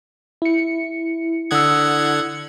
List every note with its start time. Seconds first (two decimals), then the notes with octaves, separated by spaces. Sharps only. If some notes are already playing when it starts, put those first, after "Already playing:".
0.42 E4 C#7
1.51 D3 F#5 D#6 E6 G#6